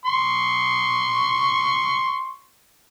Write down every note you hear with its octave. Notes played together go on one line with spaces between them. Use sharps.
C6 C#6